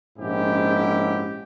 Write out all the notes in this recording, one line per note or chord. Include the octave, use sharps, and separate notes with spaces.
A#1 G#2 C#4 E4 G4